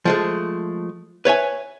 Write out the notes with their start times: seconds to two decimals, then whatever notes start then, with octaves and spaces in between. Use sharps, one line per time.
0.05 F3 G#3 A3
1.25 B4 C#5 E5 G#5